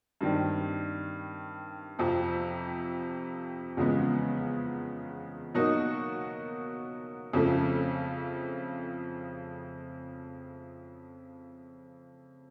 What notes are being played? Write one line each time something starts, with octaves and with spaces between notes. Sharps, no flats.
G2 D#3 G3 C4
F2 C3 F3
E2 C#3 F3 G#3 B3
B2 F#3 A#3 D#4 F#4
F2 C#3 F3 A3